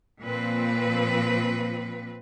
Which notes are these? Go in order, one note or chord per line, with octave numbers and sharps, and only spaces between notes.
A#2 F3 C4 B4